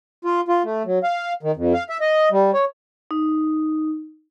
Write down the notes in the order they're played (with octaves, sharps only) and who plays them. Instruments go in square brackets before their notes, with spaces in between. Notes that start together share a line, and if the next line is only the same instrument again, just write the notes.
[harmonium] F4
F4
A3
F#3
F5
D#3
F2
F5
E5
D#5
G3
C#5
[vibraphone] D#4